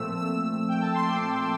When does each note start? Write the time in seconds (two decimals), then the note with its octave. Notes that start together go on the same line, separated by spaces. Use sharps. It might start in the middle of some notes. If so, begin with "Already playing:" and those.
Already playing: A#2 F3 A3 C4 E6
0.17 E6
0.68 G5
0.81 A5
0.94 C6
1.07 D6